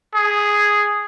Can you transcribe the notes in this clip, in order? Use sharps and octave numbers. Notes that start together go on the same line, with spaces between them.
G#4